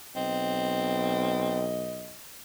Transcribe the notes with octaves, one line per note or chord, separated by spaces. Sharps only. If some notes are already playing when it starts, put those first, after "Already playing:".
B1 C4 D#5